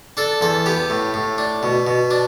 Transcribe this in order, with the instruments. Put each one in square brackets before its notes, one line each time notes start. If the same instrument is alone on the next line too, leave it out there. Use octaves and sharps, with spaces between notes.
[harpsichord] D4 A4
E2 A4
B3 G4
A2
A2
D4
B2
B2
D4